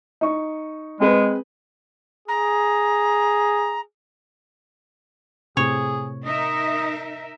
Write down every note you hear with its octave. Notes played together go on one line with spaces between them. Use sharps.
D#4 C#6
G#3 C4 G#4 B4
G#4 A#5
A2 C3 G#4 C#5
D#4 A#4 D#5 E5